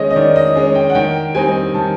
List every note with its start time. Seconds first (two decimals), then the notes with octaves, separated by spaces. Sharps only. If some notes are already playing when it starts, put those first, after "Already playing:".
Already playing: D#3 G#3 C#4 D#5
0.11 D#5
0.16 D#3 D5
0.36 D#5
0.56 G#3 C#4
0.75 G5
0.90 F#5
0.95 D#3 G5
1.35 G3 C4 D#4 G#5
1.74 D#3 A5